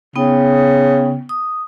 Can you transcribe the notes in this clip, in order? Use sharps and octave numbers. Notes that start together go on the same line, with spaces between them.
C#3 B3 D#4 G5
D#6